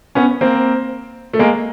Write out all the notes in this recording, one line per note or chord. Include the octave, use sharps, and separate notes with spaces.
B3 C#4
A#3 C4
A3
G#3 A#3